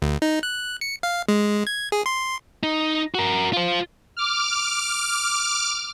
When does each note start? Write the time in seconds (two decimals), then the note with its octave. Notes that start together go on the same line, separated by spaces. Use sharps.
0.02 D2
0.22 D#4
0.43 F#6
0.81 C#7
1.03 F5
1.28 G#3
1.67 G#6
1.92 G#4
2.06 C6
2.63 D#4
3.15 F#4 A#4
3.53 F4 C5
4.17 D6 F6